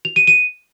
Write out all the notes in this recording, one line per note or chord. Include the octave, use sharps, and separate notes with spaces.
F7
D#7
D#7